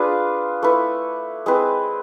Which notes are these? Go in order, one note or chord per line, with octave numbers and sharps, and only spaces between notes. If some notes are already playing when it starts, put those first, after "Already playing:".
Already playing: D4 F4 G#4 B4
A3 E4 B4
G#3 C4 E4 B4